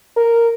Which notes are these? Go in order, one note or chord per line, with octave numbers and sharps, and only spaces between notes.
A#4